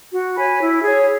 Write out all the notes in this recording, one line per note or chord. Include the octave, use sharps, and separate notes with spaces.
F#4
C#5 G#5 B5
E4
G#4 C#5